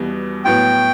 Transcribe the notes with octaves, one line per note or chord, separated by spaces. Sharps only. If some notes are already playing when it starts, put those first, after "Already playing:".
Already playing: E2 B2 G3
A2 F#3 B3 G5